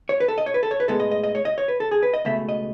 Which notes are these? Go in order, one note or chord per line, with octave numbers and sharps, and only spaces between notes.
C#5
B4
A4
D#5
C#5
B4
A4
C#5
B4
A2 G#3 B3 A4
D#5
D#5
D#5
C#5
D#5
C#5
B4
A4
G#4
B4
D#5
C#2 B2 A3 E5
D#5